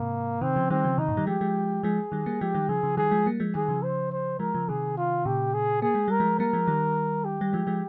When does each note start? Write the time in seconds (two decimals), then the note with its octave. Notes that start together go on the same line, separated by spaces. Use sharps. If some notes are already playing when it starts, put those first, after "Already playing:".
Already playing: G#2 C3 A#3
0.41 C3 D#3 C4
0.56 C#3 F3
0.70 D#3 G3 C4
0.84 C#3 F3
0.98 C3 D#3 D#4
1.08 G2 A#2
1.17 D#3 G3
1.27 F3 G#3 G4
1.41 F3 G#3
1.83 F3 G#3 G#4
2.12 D#3 G3
2.26 G3 A#3
2.41 F3 G#3 G4
2.55 D#3 G3
2.69 C#3 F3 G#4
2.83 C#3 F3
2.97 D#3 G3 G#4
3.11 F3 G#3
3.26 G3 A#3
3.40 F3 G#3
3.55 D#3 G3 G#4
3.68 C#3 F3
3.83 C5
4.12 C5
4.40 F3 G#3 A#4
4.54 C#3 F3
4.69 C3 D#3 G#4
4.98 F4
5.25 A#2 C#3 G4
5.54 G#4
5.82 A#3 G#4
5.95 G#3
6.08 G3 A#4
6.20 F3 G#3
6.39 G3 A#3 A#4
6.53 F3 G#3
6.67 D#3 G3
7.25 G4
7.41 G3
7.53 F3 G#3
7.67 F3 G#3